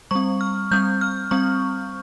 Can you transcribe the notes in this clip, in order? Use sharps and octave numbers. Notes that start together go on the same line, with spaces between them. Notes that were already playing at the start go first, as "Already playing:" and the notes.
G3 C4 C#6
F6
G3 C4 G6
F6
G3 C4 C#6